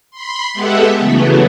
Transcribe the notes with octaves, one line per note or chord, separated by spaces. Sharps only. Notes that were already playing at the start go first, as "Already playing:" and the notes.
B5 C6
G#3 B3 G4 A4 E5 F#5
C#3 E3 F#3 A3 B3